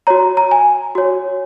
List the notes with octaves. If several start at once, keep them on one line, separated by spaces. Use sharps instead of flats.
F#4 C#5 A#5
A#5
G#5
F#4 C#5